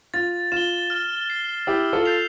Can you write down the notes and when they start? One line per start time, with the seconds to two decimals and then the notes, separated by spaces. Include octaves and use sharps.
0.14 F4 A6
0.52 F4 E7 G7
0.90 F6
1.30 C7 G7
1.67 E4 G4 E6
1.93 F4 A4
2.05 G6 C7 F7